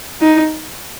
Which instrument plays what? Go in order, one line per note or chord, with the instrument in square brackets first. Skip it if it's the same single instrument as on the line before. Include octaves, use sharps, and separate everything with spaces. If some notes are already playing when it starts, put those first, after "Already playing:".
[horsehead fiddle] D#4